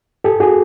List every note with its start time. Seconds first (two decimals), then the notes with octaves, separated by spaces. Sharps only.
0.24 G4 A4
0.40 F#4 G#4